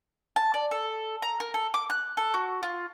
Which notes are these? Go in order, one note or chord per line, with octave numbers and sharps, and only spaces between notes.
A5
D5
A4
A#5
A#4
A4
D6
F#6
A4
F#4
F4